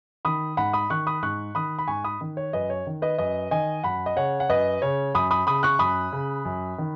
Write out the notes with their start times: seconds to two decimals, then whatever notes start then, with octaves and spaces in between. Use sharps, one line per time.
0.25 D#3 B5 D#6
0.57 G#2 F#5 B5
0.73 B5 D#6
0.90 D#3 C#6 F#6
1.07 B5 D#6
1.23 G#2 C#6 F#6
1.55 D#3 B5 D#6
1.79 B5
1.88 G#2 G#5 C#6
2.04 B5 D#6
2.21 D#3
2.37 C#5
2.53 F#2 B4 D#5
2.70 C#5
2.87 D#3
3.02 B4 D#5
3.18 F#2 B4 D#5
3.51 D#3 D#5 G#5
3.83 F#2 F#5 B5
4.06 D#5
4.16 C#3 C#5 F#5
4.40 F#5
4.49 F#2 B4 D#5
4.82 C#3 C#5
5.14 F#2 B5 D#6
5.31 B5 D#6
5.47 C#3 B5 D#6
5.63 C#6 F#6
5.79 F#2 B5 D#6
6.12 C#3
6.45 F#2
6.78 D#3